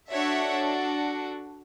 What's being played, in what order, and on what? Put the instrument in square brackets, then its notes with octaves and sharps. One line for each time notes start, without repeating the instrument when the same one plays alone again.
[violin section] D4 F#4 A4 C#5 E5